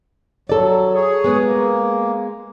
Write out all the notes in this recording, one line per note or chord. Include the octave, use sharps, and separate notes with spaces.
F#3 A4 D5
G#4 C#5
G#3 B3
A#3